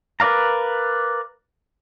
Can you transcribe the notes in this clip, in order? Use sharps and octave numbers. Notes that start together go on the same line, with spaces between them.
A#4 B4 D5 F5 A#5